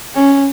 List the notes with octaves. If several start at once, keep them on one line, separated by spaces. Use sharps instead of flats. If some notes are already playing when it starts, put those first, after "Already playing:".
C#4